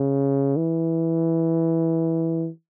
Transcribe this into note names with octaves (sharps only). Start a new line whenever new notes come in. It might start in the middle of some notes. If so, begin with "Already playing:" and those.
Already playing: C#3
E3